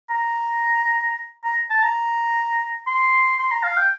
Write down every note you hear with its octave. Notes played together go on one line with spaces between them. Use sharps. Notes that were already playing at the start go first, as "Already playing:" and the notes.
A#5
A#5
A5
A#5
C6
C6
A#5
F5
G5